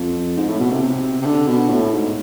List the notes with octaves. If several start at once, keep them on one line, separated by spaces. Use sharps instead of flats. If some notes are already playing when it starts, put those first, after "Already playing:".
Already playing: F2
G#2
A2
B2
C3
C3
C3
D3
B2
A2
G#2